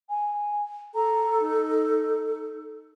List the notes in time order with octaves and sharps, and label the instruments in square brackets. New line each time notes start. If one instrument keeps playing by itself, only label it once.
[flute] G#5
[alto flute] A4 [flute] A#5
[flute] D#4